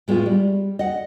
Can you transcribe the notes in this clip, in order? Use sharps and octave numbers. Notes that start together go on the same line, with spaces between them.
A2 G#3 B3 E4 F4 G#4
G3
D#5 F#5